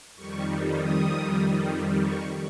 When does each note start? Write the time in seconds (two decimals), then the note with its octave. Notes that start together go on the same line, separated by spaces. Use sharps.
0.15 F2 D#3 G3 C#6
0.77 D#6
1.99 C#6